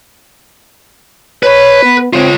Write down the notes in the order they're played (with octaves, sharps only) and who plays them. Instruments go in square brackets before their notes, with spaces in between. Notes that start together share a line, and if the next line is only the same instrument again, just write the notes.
[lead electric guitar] B4 B5 [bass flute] C#5
[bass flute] B3
[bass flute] C4 [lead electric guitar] F4 C#5